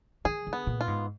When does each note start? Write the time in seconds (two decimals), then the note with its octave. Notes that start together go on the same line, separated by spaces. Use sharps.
0.25 D#3 G#4
0.47 D3
0.53 B3
0.67 A#2
0.81 F4
0.88 G#2